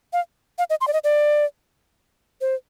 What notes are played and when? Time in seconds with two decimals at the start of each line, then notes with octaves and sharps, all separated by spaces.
0.13 F5
0.58 F5
0.70 D#5
0.81 C6
0.88 D5
0.93 D#5
1.04 D5
2.41 C5